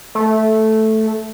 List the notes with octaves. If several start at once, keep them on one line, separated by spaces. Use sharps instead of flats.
A3